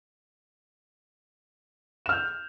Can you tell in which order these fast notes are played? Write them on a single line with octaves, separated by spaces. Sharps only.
E7 F6 G6